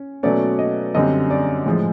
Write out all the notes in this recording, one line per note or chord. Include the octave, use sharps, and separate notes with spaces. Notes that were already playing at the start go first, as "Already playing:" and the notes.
Already playing: C#4
B2 F#3 A3 C#4 D5
D#5
F#2 D3 G3 C4 D#5
D5
A2 F3 G#3 G#4